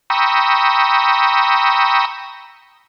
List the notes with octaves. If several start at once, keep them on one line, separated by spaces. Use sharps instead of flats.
G5 A#5 B5 C#6 D#6 E6